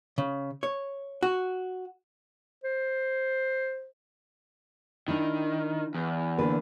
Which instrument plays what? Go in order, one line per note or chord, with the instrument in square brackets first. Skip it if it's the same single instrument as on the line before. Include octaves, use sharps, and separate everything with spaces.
[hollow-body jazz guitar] C#3
C#5
F#4
[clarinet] C5
[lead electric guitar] D#3 [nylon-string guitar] D4 E4
[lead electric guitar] E2
[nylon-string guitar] D3 A#3 B4